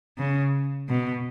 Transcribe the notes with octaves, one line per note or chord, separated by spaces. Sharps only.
C#3
B2